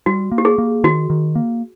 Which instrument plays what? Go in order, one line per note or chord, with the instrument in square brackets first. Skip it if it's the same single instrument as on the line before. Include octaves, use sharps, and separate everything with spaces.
[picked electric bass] G3 [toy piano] F#4
[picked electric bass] A#3
[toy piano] G4
G#4
[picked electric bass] A#3
[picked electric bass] D#3 [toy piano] F#4
[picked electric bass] D#3
A#3